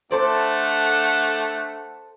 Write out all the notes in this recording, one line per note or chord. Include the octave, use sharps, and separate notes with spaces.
A3 D4 A4 C5 D5 F#5